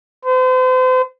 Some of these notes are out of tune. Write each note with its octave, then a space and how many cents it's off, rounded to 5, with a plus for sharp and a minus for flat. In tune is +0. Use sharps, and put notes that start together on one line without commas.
C5 -40